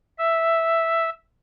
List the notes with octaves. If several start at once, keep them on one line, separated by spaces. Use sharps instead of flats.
E5